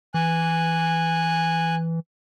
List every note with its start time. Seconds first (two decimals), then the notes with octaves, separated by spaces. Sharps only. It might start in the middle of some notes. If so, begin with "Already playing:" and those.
0.14 E3 G#5 F#6